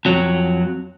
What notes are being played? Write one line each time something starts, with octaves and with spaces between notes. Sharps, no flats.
F2 F#3